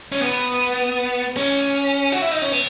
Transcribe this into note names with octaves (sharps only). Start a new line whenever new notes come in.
C#4
B3
C#4
F#4
E4
D#4
C#4
B3